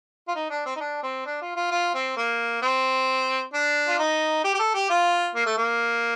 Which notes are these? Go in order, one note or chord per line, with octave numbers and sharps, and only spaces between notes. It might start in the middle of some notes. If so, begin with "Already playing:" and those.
F4
D#4
D4
C4
D#4
D4
C4
D4
F4
F4
F4
C4
A#3
C4
D4
F4
D#4
G4
G4
A4
G4
F4
A#3
A3
A#3